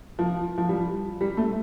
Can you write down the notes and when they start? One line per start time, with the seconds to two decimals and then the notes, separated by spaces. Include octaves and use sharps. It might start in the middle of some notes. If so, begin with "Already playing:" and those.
0.19 F3
0.58 F3
0.69 G3
1.21 G3
1.37 A3